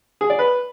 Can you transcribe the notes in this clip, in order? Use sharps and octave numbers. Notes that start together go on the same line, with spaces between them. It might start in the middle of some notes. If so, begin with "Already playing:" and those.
G#4
D5
B4